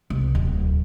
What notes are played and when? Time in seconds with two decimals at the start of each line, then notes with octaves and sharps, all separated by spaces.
0.10 C2
0.35 D1